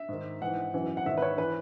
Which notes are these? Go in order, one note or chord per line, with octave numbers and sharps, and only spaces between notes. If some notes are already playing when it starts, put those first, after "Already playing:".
Already playing: E5
G#2 D#3
G#2 E3 F#5
F#2 E3
F#5
G#2 D#3 E5
B4
C#5
E3 B4